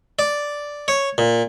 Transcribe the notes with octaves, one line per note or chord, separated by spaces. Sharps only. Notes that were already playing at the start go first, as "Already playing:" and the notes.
D5
C#5
A#2